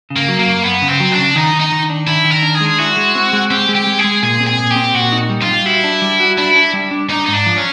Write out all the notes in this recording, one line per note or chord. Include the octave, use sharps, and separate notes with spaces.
C#3
A#3
F#3
A#3
F#2
F#2 B3
C#3
C4
F#3
D4
C#3
D#3 D#4
D#3
D#4
D#3
D4
D#3 E4
D#3
A#4
D4
G#4
G#3
E4 F#4
G#3
C4
G#3
C4 G4
G#3
G4
G#3
G#4
G#3
A#2 G#4
C4
G#4
A#2
G4
C4
A#2 F#4
D#4
G3
F4
G3
E4 F#4
D4
G3
F#4
D4 E4
D4
G3
D4
D4 D#4
G#2 D#4
D4
F3
C#4